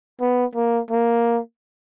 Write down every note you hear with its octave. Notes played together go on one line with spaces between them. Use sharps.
B3
A#3
A#3